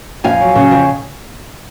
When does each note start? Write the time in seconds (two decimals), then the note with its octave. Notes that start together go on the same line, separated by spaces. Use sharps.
0.24 F2 F5 G#5
0.40 F#3
0.55 C#3
0.71 F2